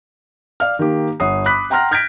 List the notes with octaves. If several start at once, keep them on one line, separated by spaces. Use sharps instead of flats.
D5 F5 F6
D#3 A#3 G4
G1 C#5 F#5 D#6 C7
B5 D6 D#6 F#6 B6
F#5 G5 A#5 C6 F6 A#6
F6 G6 G#6 A#6 B6 D7